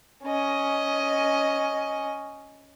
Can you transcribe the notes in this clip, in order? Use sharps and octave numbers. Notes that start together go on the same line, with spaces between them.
C#4 D#5